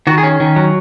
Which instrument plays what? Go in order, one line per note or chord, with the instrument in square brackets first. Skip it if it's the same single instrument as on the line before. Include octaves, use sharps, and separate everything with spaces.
[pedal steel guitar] D#3 F#4
G#4
C#4
D#3
F#3